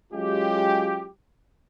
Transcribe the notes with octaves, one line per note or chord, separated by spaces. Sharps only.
F#3 G#3 C#4 F4 G4